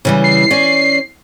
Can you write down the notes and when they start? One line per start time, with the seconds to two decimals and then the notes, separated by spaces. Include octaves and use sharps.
0.05 C#3 E3 G3
0.24 C7
0.50 C#4 D5